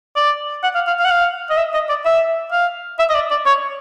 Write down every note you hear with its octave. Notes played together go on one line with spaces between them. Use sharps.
D5
F#5
F5
F5
F5
F#5
F5
D#5
E5
D#5
D5
E5
F5
E5
D#5
D5
D5
C#5